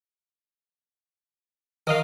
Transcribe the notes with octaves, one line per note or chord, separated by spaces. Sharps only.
D#3 A#4 D#5 F5